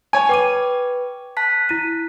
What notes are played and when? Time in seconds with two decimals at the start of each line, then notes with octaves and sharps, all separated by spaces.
0.13 C#5 G#5
0.29 B4 G5 D6 D#7
1.37 A5 F#6 B6
1.69 E4 D#7